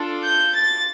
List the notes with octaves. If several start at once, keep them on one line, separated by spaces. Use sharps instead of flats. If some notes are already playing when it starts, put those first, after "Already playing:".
Already playing: D4 F4 A4
G6
A6